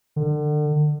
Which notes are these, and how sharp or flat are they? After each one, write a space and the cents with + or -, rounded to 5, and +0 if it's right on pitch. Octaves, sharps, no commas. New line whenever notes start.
D3 +35